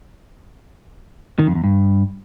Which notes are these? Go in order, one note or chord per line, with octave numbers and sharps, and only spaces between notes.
D#3
F2
E2
G2